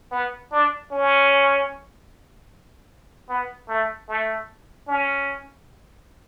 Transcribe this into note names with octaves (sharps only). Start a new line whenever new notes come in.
B3
D4
C#4
B3
A3
A3
C#4